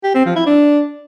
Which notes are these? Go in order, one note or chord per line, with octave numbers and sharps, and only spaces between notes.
G4
C4
F3
E4
D4